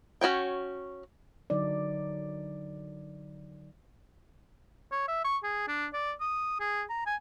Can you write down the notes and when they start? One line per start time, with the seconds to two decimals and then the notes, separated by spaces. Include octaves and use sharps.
0.21 C#4 F#4 C#5 G5
1.50 D3 F#3 D#4 D5
4.91 C#5
5.08 E5
5.24 C#6
5.43 G#4
5.68 D4
5.93 D5
6.20 D#6
6.60 G#4
6.89 A#5
7.06 G#5